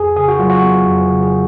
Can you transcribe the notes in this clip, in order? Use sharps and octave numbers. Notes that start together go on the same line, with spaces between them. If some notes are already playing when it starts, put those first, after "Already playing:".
Already playing: F2 G#4
C#3 G#4
F#4
F#3 F4
F#4
B3
F2
C#3
G#4